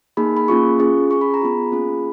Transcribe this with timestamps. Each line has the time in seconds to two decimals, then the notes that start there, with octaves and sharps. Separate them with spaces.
0.17 A#3 D#4 G#4 B5
0.37 B5
0.48 A#3 C#4 F4 G#4 C#6
0.79 C#4 F4 G#4
1.10 C#4 G#4 C#6
1.21 B5
1.34 A#5
1.42 B3 F4 G#4 B5
1.72 A#3 C#4 F4 G#4